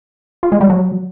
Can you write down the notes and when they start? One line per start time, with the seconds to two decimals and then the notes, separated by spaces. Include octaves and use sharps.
0.43 F4
0.52 G#3
0.61 G3
0.70 F#3